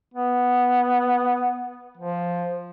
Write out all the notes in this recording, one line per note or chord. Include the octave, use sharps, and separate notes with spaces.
B3
F3